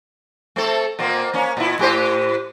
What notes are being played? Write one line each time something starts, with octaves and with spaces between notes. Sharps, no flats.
A3 C4 A4
A#2 A#3 C4
A#3 C#4
A#2 E4
A2 G4 C5